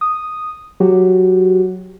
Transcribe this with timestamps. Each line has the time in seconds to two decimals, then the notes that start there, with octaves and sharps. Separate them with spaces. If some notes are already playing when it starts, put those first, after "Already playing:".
0.01 D#6
0.80 F#3 F#4 G4